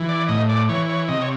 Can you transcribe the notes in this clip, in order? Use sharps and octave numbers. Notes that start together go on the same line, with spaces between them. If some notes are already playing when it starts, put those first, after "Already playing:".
Already playing: E3
D5
A2 D#5
D5
E3 C#5
C#5
C3 D#5
C#5